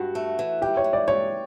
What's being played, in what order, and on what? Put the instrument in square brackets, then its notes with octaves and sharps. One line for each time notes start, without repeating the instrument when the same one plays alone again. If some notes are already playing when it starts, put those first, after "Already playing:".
Already playing: [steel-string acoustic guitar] G2 [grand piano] F#4
[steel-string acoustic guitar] A3
E3
[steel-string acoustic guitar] G3 [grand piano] G4
[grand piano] C#5
[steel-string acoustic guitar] E3
[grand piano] D5
[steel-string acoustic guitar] G2 [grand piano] C#5